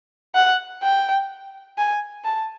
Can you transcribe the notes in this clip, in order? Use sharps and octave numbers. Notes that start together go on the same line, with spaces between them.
F#5
G5
G#5
A5